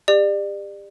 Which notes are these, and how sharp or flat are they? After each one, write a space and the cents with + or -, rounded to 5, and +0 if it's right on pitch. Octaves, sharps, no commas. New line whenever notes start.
G4 +35 D5 +30